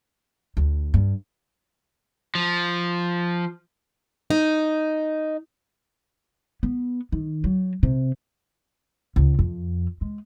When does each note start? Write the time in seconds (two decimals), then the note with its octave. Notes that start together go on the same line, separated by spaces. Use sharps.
0.57 D2
0.94 G2
2.35 F3
4.30 D#4
6.63 B3
7.12 D#3
7.44 F#3
7.83 C3
9.16 C#2
9.39 F2
10.01 G#3